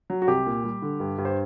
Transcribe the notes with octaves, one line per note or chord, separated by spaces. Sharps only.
F#3
F#4
C2 G4
A#2
G3
D3
G2
G2
C5